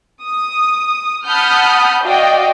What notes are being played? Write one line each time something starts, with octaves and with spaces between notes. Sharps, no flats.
D#6
F#5 A5 B5 D#6 F6 G6
F#4 D5 D#5 F5 G5